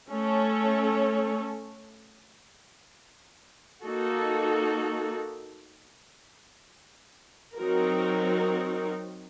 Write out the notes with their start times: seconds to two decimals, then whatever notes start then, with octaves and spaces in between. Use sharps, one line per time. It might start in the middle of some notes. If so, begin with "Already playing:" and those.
0.10 A3 C#4 A4 C#5
3.83 A#3 D#4 F#4 A4
7.57 F#3 C4 D#4 F#4 A#4